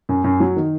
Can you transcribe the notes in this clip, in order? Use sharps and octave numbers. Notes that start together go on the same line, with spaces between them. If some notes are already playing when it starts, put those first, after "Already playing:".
F#2
F#2
F#3
D#3